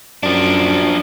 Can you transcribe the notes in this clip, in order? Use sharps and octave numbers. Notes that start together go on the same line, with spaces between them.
F#2 F3 D4